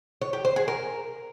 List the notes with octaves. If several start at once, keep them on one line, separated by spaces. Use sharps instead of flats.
C#5
G4
C5
G#4
A#4